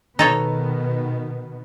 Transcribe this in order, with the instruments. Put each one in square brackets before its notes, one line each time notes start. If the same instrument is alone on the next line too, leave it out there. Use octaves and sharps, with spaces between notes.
[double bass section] B2 D#3 B3 [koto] D#4 A4 C#5